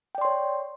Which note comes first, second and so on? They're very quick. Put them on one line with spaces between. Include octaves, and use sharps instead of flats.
G5 D5 C6 C#5